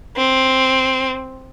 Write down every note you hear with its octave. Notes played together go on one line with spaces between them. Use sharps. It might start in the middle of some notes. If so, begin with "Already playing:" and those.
C4